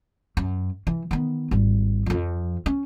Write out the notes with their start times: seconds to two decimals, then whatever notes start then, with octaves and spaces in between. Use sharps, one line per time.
0.37 F#2
0.87 E3
1.11 D#3 B3
1.51 G#1 G3
2.06 F2 F3
2.66 C#4